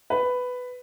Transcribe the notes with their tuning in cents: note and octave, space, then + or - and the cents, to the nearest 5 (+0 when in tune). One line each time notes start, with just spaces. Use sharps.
B4 +10